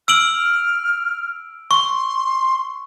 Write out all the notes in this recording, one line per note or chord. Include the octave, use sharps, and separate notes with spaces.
E6 F6 D7 F#7
C6 C#6